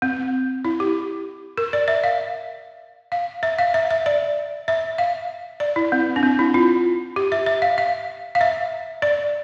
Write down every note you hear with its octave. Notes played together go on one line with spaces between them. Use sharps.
C4
E4
G4
A#4
D5
E5
F5
F5
E5
F5
E5
E5
D5
E5
F5
D5
E4
C4
D4
C4
E4
F4
G4
E5
E5
F5
F5
F5
E5
D5